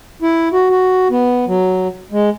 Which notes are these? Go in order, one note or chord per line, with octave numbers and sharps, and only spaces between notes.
E4
F#4
F#4
B3
F#3
G#3